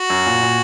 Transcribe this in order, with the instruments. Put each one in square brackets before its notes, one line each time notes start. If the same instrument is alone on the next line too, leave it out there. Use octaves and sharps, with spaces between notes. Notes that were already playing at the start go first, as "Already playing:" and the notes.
Already playing: [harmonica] F#4
[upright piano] F#2
A#2
A#2